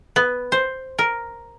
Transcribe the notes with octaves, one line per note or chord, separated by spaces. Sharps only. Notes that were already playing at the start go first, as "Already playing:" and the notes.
B3
C5
A#4